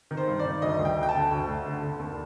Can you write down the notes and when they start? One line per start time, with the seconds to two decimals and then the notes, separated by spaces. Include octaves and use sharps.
0.11 D#3
0.17 C5
0.28 G2
0.40 D5
0.45 D#3
0.62 D2 D#5
0.79 D2
0.85 G5
0.97 D2
1.03 G5
1.09 A5
1.14 D3
1.31 D2
1.48 D2
1.65 D3
1.82 D3
1.99 D#2